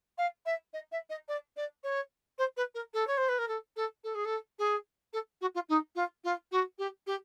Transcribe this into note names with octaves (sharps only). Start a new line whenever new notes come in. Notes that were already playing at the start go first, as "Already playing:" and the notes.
F5
E5
D#5
E5
D#5
D5
D5
C#5
C5
B4
A#4
A4
C#5
C5
B4
A#4
A4
A4
A4
G#4
A4
G#4
A4
F#4
F4
D#4
F4
F4
F#4
G4
G4